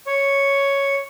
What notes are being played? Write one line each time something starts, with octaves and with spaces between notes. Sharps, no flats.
C#5